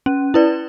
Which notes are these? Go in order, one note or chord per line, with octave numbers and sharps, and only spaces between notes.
C#4
E4 B4 D5